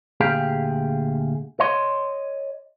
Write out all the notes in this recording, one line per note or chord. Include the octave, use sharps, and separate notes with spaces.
D2 A#2 G4 G#4 F5 G5
C#5 D#5 C6